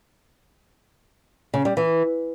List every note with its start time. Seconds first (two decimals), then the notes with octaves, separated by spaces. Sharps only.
1.54 C#3
1.65 G3
1.77 E3